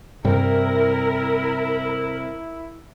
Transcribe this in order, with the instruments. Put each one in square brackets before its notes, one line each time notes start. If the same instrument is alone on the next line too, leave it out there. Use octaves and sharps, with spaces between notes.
[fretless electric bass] G2 [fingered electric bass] C3 G3 [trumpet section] E4 [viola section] A#4